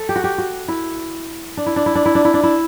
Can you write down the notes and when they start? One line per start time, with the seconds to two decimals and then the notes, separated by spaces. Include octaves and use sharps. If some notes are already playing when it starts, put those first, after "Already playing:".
Already playing: A4
0.09 G4
0.16 F#4
0.24 G4
0.38 F#4
0.68 E4
1.57 D4
1.66 E4
1.76 D4
1.86 E4
1.95 D4
2.06 E4
2.15 D4
2.25 E4
2.34 D4
2.43 E4